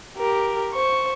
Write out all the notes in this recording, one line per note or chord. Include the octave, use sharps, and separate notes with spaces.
G4 A#4
C5 C#6